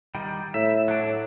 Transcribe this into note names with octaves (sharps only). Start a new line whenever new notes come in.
D#3 G3
A2 E5
F#3 D4